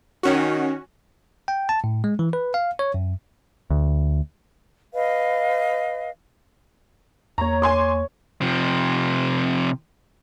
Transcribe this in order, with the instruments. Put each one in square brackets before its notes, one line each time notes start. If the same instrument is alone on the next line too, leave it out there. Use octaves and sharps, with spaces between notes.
[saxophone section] D#3 [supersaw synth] C#4 F#4
[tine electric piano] G5
A5
A2
G#3
E3
B4
F5
C#5
F#2
[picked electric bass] D2
[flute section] B4 D#5 F5
[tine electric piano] E2 A#3 [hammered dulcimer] C#5 C#6 [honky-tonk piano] A#5
[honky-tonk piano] G#5 C6 D6
[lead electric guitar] C3 F3